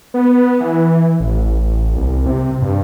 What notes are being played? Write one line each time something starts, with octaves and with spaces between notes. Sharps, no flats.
B3
E3
A1
C2
C3
G2